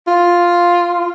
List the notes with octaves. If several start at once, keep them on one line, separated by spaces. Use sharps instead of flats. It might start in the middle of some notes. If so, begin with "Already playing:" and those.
F4